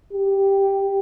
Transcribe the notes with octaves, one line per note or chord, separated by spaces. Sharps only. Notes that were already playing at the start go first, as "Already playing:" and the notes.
G4